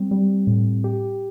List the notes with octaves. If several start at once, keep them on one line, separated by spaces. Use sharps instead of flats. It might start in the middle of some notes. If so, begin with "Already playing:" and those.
Already playing: G3 C4
G3
A2
G4